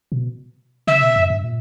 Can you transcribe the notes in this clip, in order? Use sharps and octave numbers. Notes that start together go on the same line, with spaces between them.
B2
C#3 E5
B2
F#2
G2
A#2